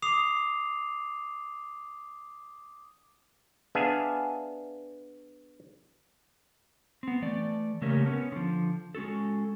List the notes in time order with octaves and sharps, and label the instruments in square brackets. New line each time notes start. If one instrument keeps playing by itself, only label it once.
[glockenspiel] D6 D#6 C7 F7
[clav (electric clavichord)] B3 D4 G#4 E5 F5 G#5
[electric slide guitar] B3 C4
E3 A3 D5
C#3 A3 A#3 C#4 G4 A#4
B3 C#4
D3 F3
G#3 C#4 F#4 A4